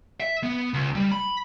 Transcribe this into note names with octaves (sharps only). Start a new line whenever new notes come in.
E5
B3
C#2
G3
B5